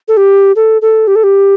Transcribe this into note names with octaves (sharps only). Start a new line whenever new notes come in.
A4
G4
A4
A4
G4
A4
G4